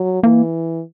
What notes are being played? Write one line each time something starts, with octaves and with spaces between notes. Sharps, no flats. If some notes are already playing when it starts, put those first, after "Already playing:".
Already playing: F#3
E3 A#3